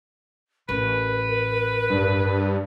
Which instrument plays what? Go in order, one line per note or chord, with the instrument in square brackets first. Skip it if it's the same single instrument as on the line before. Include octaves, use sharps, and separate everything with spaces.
[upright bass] A1 [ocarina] A#4 [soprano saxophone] B4
[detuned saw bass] G2